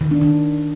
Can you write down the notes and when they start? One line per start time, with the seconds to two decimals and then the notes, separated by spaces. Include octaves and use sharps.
0.01 D#3
0.11 D4
0.21 D#3